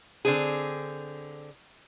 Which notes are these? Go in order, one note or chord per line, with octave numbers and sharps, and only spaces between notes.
D3 C4 G#4